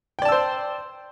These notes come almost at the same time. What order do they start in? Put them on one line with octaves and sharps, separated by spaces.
G5 D5 A5 E6 C5